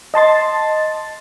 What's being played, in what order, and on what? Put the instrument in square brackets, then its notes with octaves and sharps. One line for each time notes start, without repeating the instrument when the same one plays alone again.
[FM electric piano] D#5 A5 C6 A6